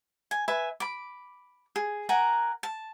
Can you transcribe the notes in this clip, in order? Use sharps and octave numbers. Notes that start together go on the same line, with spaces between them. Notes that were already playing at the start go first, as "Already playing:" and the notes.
G#5
B4 E5 G#5
B5 D6
G#4
A#4 F#5 G#5 A#5
A5